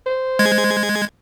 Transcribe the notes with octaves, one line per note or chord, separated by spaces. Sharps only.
C5
G#3 G#6